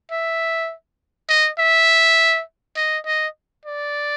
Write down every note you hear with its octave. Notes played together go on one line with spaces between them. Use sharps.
E5
D#5
E5
D#5
D#5
D5